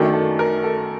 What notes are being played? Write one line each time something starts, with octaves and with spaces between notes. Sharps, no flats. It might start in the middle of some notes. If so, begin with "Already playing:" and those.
Already playing: F#2 D#3 F#3 A3 D4
A4
A#4
A4